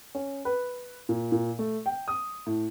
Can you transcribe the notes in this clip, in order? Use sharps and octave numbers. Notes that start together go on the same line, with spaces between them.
C#4
B4
A#2
A#2
A3
G5
D#6
A2